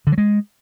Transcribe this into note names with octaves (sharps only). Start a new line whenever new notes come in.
D3
F#3
G#3